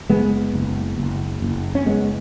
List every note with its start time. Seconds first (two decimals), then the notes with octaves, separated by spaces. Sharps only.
0.09 F#1 G#3 B3
0.53 F#1
0.98 F#1
1.42 F#1
1.75 C#4
1.86 F#1 G#3 B3